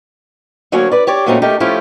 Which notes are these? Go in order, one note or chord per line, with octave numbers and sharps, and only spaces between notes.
D2 F#3 A#3 C#4 C#5 G#5
B4 D5
G4 C#5 D5
A#2 F#3 A3 C4 C#4 D#4
A3 D#4 G4 A#4
F3 A3 C#4 E4 F4 G4